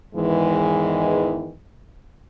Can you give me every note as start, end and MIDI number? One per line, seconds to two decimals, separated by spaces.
0.15 1.53 40
0.15 1.53 44
0.15 1.53 51
0.15 1.53 52
0.15 1.53 56